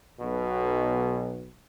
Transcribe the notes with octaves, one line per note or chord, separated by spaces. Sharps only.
B1 B2